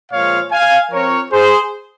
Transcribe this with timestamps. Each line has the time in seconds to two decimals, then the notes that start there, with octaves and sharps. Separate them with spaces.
0.12 A#2 F3 G#3 C#5 F5
0.52 F5 G#5
0.91 F3 C4 A#4 C#5
1.31 G#4 C5